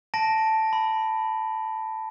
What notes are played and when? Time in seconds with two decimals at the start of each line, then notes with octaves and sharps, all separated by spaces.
0.14 A5 A#6 D7
0.73 B5